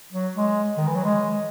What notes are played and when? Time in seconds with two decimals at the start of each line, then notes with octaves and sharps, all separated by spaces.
0.13 F#3
0.35 G#3
0.78 D#3
0.86 E3
0.95 F#3
1.04 G#3